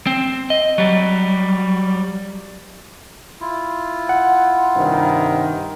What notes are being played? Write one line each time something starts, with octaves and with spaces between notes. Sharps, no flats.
C4
D#5
F#3 G3
E4 F4
F#5
G2 C3 D#3